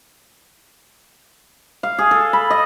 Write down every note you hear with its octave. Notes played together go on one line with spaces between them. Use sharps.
F5
G#4
A4
B5
D#5